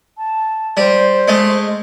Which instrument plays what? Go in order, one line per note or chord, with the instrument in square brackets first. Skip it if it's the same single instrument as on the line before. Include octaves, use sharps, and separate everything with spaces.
[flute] A5
[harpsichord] G3 [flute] C5
[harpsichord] G#3 A3